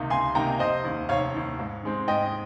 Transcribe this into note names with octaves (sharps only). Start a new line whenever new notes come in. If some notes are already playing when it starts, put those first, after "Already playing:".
Already playing: C#2 C3 D#3 A#3 D#4
C#2 G#5 C6
C3 D#3 A#3 D#4 G5 A#5
F1 C5 D#5
D#2 D#3
F1 C#5 F5
D#2 D#3
G#2
D#3 G#3 C4
G#2 D#5 G5